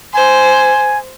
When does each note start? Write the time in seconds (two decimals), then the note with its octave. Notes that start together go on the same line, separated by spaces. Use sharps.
0.14 C5 G#5